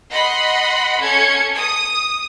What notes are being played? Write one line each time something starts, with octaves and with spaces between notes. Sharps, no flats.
D#5 F#5 B5 C6
C#4 A4 G#6 C#7
D#6